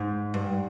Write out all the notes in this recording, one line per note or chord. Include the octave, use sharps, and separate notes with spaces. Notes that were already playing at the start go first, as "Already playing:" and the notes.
Already playing: G#2
G2